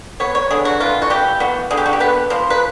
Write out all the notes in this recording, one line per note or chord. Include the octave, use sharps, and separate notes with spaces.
B3 C#5
C#5
D3 G#4
F#4
E3 F4
F#4
E3 G4
B3 F#4
D3 G#4
G4
F#4
G4
B3 B4
F3
B4